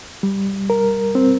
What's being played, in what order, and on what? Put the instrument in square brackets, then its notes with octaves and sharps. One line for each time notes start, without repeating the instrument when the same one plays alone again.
[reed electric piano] G3
A#4
C4